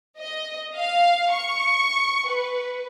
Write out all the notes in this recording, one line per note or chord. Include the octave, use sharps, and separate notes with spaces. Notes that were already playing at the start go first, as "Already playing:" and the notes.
D#5
F5
C#6
B4